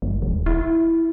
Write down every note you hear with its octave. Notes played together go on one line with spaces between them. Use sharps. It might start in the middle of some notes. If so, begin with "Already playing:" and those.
G1
D#1
E4